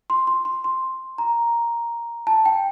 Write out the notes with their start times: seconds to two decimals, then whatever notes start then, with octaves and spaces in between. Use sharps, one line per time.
0.10 C6
0.27 C6
0.45 C6
0.64 C6
1.18 A#5
2.27 A5
2.46 G5